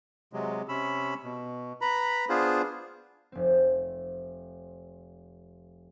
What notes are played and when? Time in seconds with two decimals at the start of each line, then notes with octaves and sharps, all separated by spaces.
0.33 C3 F#3 G#3
0.69 C3 C#4 B5 E6
1.24 B2
1.81 B4 A#5 B5
2.29 B3 D4 F4 G#4 C5
3.32 F1 C4